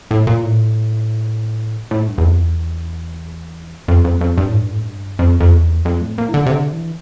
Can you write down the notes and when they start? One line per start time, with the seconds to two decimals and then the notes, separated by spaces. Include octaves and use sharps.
0.11 A2
0.27 A#2
0.43 A2
1.91 A2
2.07 G2
2.18 E2
2.24 F2
2.41 E2
3.88 F2
4.04 F2
4.21 F2
4.38 G2
4.49 A2
4.60 G2
4.70 A2
4.82 G2
5.19 F2
5.40 F2
5.52 E2
5.85 F2
6.01 A2
6.18 A#2
6.29 E3
6.34 D3
6.46 C3
6.51 D3
6.73 E3